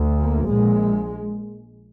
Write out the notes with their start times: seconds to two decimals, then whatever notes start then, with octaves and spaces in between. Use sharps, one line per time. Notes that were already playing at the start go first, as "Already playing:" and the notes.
Already playing: D2
0.21 A#3
0.50 A#1 A#2 G#3